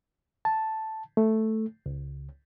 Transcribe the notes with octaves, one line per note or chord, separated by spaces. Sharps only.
A5
A3
C#2